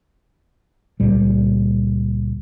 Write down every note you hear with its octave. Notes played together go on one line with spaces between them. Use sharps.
C#2 A#2 G3